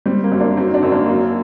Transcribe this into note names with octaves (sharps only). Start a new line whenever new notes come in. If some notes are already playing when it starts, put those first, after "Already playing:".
G3 C4
A#3
F#2
A#3 D4
F#3 C4 D#4
D4 F#4
F#2
A#3 D4
F#3 A#3